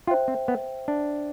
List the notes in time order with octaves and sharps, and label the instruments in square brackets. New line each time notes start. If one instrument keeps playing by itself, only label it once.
[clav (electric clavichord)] F4 [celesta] C5 E5 G5
[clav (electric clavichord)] C4
B3
D4